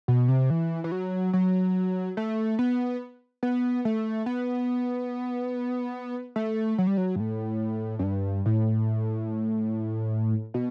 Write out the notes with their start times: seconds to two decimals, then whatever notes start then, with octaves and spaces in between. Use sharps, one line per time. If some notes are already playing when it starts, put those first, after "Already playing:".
0.08 B2
0.28 C3
0.50 E3
0.84 E3
0.92 F#3
1.33 F#3
2.17 A3
2.59 B3
3.43 B3
3.85 A3
4.26 B3
6.36 A3
6.78 F#3
6.87 G3
6.97 F#3
7.16 G2
7.20 A2
7.99 F#2
8.03 G2
8.46 A2
10.54 B2